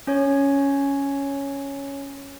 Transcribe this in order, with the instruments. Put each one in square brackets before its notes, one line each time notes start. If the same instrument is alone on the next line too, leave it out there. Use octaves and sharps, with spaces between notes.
[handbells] C#4 C#5 G#6